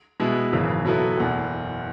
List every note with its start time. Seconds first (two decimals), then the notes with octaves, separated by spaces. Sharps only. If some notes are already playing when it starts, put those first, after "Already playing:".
0.20 B2 G#3 B3 E4
0.52 G#1 F#2 C#3 E3
0.85 B2 F#3 B3 E4 A4
1.18 F#1 E2 B2